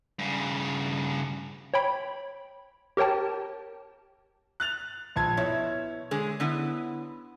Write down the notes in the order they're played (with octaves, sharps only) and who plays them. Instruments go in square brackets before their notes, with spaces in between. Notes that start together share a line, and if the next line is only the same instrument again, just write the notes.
[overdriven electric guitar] G2 C#3
[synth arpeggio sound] C#5 G5 B5
G4 A#4 C#5 G5 A5
[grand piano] F#6 A6 F7
A#1 A5 G#6
[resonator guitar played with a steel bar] B2 E4 [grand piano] C#5
[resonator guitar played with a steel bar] D3 G#3 G#4
D3 B3 E4